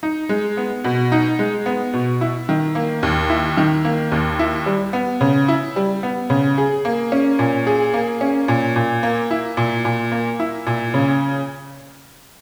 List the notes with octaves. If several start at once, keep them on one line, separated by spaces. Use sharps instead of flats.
D#4
G#3
B3
B2
D#4
G#3
B3
B2
E4
D#3
A#3
D#2
E4
D#3
A#3
D#2
E4
G3
B3
C#3
E4
G3
B3
C#3
G#4
A#3
C#4
A#2
G#4
A#3
C#4
A#2
A#2
A#3
E4
A#2
A#2
A#3
E4
A#2
C#3